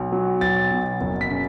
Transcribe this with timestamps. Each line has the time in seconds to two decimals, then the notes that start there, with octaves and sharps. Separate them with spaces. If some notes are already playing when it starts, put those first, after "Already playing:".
Already playing: B1
0.12 F#3
0.41 B1 A6
0.71 B2
1.01 F#1
1.21 B6
1.31 C#3